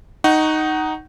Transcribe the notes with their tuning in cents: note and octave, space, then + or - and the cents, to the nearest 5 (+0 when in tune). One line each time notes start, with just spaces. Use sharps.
D#4 +0 F#5 +25 C#6 +0